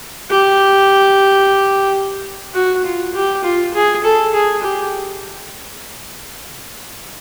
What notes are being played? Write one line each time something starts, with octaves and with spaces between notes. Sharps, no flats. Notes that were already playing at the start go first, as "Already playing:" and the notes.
G4
F#4
F4
G4
F4
G#4
A4
G#4
G4